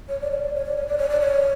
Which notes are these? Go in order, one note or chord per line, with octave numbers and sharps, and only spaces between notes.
C#5
D5
C#5
D5
C#5
D5
C#5
D5
C#5
D5
C#5